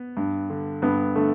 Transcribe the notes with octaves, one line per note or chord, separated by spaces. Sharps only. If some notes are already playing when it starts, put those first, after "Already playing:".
Already playing: B3
G2
D3
G2 B3
D3 A3